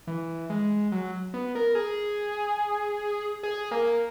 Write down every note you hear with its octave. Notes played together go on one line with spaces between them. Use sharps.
E3
G#3
F#3
B3
A#4
G#4
G#4
A#3